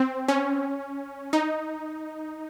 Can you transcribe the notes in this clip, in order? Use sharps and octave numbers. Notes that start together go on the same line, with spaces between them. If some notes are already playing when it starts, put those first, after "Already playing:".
Already playing: C4
C#4
D#4